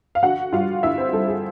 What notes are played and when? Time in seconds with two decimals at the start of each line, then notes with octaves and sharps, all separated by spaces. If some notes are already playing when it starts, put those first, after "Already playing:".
0.15 F5
0.23 D3 F#4 F#5
0.53 G3 F4 F5
0.83 D3 E4 E5
0.98 C4 C5
1.13 G3 A4
1.28 G#4